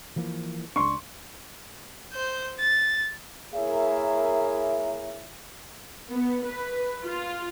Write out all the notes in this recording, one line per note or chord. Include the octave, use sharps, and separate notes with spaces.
E3 F3 A#3
C#2 D4 C6 C#6
C5 G6
A6
A#3 E4 G#4 A#4 C#5 E5
B3
B4
F4